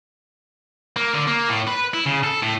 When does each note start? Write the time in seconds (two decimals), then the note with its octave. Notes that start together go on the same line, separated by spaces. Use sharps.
0.96 A#3
1.15 D3
1.28 A#3
1.50 A2
1.68 B4
1.94 E4
2.06 C#3
2.24 A4
2.43 A2